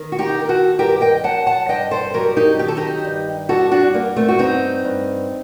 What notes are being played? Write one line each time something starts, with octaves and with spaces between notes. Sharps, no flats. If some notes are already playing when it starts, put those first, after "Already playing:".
Already playing: D#3
F#4
D#4 G4
D#3
A#4
F#4 A4
G2 G4 A#4
D#5 G5
F#3 F#5 A5
F#5 A5
G2 D#5 G5
A4 C5
F#3 G4 A#4
D#4 G4
D#3 G4
A4
D#4 G4
G2
G3 F#4 A4
D4 F#4
G2 A#3
A3 C4
F#4
G2 C4 D#4
G2